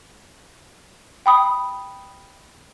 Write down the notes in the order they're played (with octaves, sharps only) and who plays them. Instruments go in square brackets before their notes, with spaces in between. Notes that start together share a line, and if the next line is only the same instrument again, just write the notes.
[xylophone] G5 B5 D#6